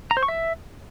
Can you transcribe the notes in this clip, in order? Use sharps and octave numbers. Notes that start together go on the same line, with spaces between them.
A#5
C5
C#6
E5